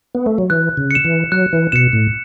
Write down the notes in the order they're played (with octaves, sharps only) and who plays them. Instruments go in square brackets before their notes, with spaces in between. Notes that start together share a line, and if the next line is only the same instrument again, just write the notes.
[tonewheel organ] B3
A3
F#3
[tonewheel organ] E3 [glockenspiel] F#6
[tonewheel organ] C#3
[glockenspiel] C#7 E7
[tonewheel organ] E3
[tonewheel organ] F#3 [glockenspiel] F#6
[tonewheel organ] E3
[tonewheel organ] B2 [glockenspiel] C#7 E7
[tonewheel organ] A2